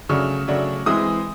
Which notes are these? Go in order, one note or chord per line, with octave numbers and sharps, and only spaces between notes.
C#3 F#3 A3 D4 C#6
C#3 F#3 A3 D4
E3 G#3 C4 D#6